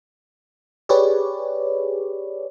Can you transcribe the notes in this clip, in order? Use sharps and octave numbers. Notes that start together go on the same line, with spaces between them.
G4 G#4 B4 C#5 D5